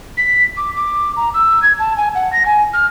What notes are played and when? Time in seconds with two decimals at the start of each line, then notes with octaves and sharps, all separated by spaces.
0.17 B6
0.57 D6
0.76 D6
1.16 A#5
1.34 E6
1.62 G#6
1.79 A5
1.97 G#5
2.15 F#5
2.32 A#6
2.45 G#5
2.73 F6